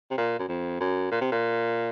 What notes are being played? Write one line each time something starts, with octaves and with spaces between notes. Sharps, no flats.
C3
A#2
F#2
F2
F#2
A#2
C3
A#2